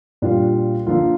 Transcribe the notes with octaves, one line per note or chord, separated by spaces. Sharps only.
A#2 G3 D4 F4
D3 F3 A#3 F4